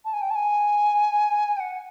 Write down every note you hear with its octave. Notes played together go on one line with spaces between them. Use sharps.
A5
G#5
G5
A5
G#5
G5
F#5